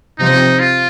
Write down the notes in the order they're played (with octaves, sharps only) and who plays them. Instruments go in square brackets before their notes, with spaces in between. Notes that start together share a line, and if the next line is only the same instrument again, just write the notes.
[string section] C3 F3 C4 [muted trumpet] D#4
[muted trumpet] F4